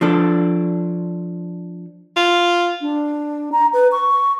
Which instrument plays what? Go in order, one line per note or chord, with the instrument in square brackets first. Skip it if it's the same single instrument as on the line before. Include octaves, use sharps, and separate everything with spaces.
[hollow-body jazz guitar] F3 D4 A4
[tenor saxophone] F4
[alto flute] D4
A#5
B4
C#6